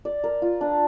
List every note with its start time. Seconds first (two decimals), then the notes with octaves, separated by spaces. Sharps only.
0.05 D5
0.24 A#4
0.42 F4
0.61 D4